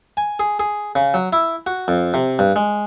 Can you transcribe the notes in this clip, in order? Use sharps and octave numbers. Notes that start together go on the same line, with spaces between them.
G#5
G#4
G#4
C#3
F#3
E4
F#4
F2
C3
G2
G#3